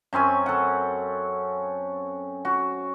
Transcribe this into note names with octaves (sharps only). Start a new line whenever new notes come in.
F#2 C4 C#4 G#5
A4 F#5
F#4